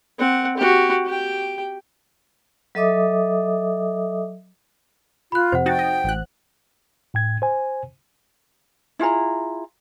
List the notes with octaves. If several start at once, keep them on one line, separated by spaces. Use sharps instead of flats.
C4 F#5
F#4 G4
G4 G5
F#3 A4 D#5 E5 D6 D#6
F4 B5 F#6
F2 C3 C5 F#5
D#4 F#4 G5 A6
D#5
A1 F#6
A2 G5 G#6
C5 G#5
E4 F4 G#4 A#5